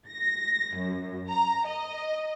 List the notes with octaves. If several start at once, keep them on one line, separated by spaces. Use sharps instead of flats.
A#6
F#2
A#5
D#5